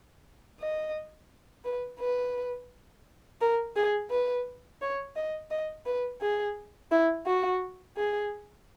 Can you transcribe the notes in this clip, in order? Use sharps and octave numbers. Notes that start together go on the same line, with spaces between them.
D#5
B4
B4
A#4
G#4
B4
C#5
D#5
D#5
B4
G#4
E4
F#4
G#4